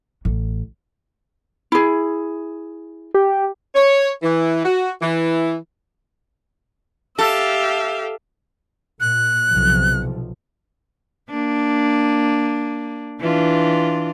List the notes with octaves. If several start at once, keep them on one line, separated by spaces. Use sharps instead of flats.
A1
E4 G#4
G4
C#5
E3
F#4
E3
G4 A4 E5 F5
A#2 F#6
B1 C3 F3
A#3 D4
E3 D4 F4